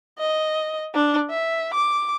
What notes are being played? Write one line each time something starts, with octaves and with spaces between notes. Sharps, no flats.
D#5
D4
E5
D6